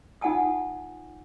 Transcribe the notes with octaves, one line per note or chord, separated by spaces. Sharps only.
D#4 F4 F#5 G#5 A5 D#6